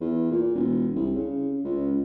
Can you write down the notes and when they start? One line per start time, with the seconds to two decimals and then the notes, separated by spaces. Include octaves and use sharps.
0.01 E2
0.31 A#2
0.55 E1
0.95 C2
1.15 C#3
1.64 C#2